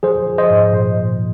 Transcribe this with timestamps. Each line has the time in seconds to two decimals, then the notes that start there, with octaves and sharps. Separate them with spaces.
0.03 F3 G#4 C5
0.27 F3
0.38 C5 D#5
0.50 G#2
0.73 A#2
0.96 A#2